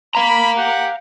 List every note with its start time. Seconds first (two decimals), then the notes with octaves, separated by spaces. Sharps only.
0.15 F5 A#5 B5
0.57 G4 F#5